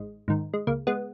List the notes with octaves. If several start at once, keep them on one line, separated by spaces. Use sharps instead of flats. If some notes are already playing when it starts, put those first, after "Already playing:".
Already playing: G#1 G#3
G#2 D#3
G#3
C#2 A#3
G#3 B3